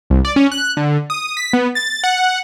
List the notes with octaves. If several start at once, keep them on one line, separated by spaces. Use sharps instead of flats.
C2
D5
C#4
F#6
D3
D#6
B6
B3
A6
F#5